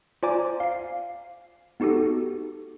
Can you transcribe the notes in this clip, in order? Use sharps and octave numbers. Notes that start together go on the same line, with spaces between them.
F4 C5 D5 G#5 A#5 D6
F5 C7
B3 D#4 F#4 G4 A4